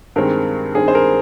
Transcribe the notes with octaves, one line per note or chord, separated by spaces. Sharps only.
G2 D#3 G#3 C4 A#4
G2 D#3 G#3 C4 G#4
C5
A#4